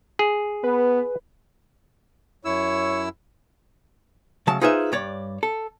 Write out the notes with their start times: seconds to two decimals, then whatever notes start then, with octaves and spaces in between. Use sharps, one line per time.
0.19 G#4
0.64 B3 B4
2.45 F#2 E4 C#5 E6
4.47 C#3 F#3 A3 A5
4.61 D#4 F4 G#4 B4 C5 E5
4.92 G2 C#5 D5
5.43 A4